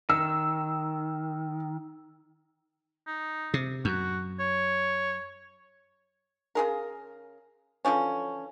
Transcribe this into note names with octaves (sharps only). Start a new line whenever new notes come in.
D#3 E6
D#4
C3
F#2 F#4
C#5
C#3 G#4 A#4
D3 E3 F3 C#4